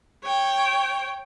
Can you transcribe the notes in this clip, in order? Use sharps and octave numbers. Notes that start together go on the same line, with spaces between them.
C#5 G5